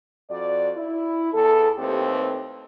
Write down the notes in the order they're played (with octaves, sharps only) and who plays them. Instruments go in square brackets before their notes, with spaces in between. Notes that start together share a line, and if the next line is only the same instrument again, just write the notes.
[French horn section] F2 F#4 D5
E4
E2 A4
D#2 A3 C4 G4 B4